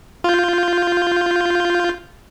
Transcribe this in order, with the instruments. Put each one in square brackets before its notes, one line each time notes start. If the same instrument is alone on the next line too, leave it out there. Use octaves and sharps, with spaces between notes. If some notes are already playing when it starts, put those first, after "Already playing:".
[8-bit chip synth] F4 G6